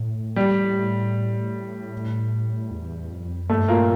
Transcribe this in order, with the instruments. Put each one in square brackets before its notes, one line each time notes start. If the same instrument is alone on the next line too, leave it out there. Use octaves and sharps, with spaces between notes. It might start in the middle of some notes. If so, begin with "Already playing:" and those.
Already playing: [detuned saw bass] A2
[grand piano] G3
[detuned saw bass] E2
F2
[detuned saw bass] G2 [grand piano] A3
[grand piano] A#2 A#3